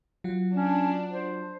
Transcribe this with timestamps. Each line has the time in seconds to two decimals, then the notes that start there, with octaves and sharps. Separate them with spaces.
0.24 F#3 F4 F#5
0.55 C#4 D4
1.10 C5